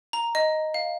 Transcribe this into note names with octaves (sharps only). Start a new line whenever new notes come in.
A#5
D#5
F5